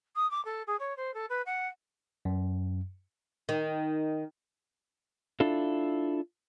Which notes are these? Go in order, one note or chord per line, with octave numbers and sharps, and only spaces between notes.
D#6
D6
A4
G#4
C#5
C5
A4
B4
F#5
F#2
D#3
D4 E4 F4 A4